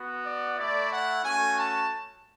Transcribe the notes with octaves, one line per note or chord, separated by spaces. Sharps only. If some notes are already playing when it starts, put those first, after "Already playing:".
Already playing: B3 F#4
D5
A3 E4 D5
F#5
A3 C#4 F#4 G#5
A5